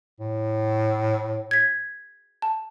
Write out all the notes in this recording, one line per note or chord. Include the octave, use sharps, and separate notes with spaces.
A2
G#6 B6
A5